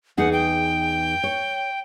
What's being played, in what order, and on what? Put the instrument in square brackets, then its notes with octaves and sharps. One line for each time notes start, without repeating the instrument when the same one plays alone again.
[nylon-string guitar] E2 D#4 G#4 [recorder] F#5
[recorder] G5
[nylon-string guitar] C#5